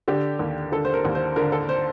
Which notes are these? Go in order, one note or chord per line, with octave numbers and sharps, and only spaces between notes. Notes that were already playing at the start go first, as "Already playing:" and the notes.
D3 G4
D#2
D3 A4
C5
A#4
D#2
C5
D3 A#4
A4
C5